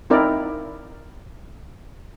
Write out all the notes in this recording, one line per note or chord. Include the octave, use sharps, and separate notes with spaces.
C4 D#4 E4 A#4 D5